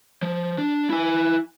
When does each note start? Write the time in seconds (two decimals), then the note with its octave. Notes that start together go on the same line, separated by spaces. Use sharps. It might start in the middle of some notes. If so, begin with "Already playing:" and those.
0.22 F3
0.58 D4
0.90 E4 G#5